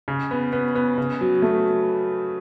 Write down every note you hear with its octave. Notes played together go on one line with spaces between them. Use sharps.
C#3
B3
B3
B3
C#3
F#3
A3